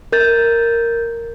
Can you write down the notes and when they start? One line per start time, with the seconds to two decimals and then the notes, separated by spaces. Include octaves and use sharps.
0.12 A#4 G6 A6